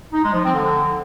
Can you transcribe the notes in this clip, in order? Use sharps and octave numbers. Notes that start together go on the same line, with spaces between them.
D#4
G#3
F3
C4
D3